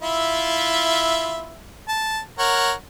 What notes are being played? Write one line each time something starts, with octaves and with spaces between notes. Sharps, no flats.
E4 F4 E5
A5
A#4 C#5 F#5